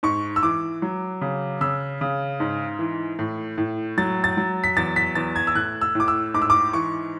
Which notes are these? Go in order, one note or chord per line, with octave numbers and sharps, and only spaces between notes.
G#2 C#6
E6
E3 D6
F#3
C#3
C#3 E6
C#3
G#2
E3
A2
A2
F#3 A6
A6
F#3
B6
E2 A6
B6
E2 A6
G#6
E6
A2 F#6
E6
A2 D6
E6
G#2 D6
E6
D6
E3 C#6